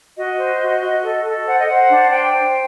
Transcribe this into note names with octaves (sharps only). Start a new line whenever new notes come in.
F#4 D#5
C5
F#4
F#4
A4
A4
C5 F#5
D#5
C5 F#5
D4
C5 G5
C5